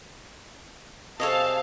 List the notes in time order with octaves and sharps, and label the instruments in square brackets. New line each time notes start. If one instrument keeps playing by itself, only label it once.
[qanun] C3 G#4 [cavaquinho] A4 C#5 D#5 [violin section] F5 A5